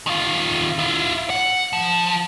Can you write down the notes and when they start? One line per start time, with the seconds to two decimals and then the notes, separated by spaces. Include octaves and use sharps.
0.07 D#3 F4
0.79 E4 F4
1.30 F#5
1.73 F3